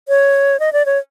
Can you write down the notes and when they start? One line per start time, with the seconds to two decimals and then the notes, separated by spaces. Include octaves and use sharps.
0.09 C#5
0.60 D#5
0.73 D5
0.86 C#5